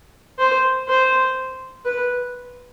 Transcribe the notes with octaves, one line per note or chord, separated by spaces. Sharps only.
C5
C5
B4